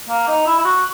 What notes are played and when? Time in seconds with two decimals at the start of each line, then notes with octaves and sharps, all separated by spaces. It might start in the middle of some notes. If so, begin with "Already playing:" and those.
0.09 A#3
0.28 D#4
0.47 E4
0.58 E4
0.65 F#4